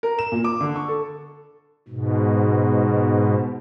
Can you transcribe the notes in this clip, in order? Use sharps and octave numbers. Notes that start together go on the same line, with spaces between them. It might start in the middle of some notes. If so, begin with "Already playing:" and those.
A#4
E7
A#2
D6
D3
C#6
A4
G#2 B2